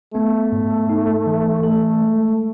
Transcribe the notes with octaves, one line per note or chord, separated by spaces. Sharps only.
A3 B3
G#2
D#4
E3
A3 A4
G#3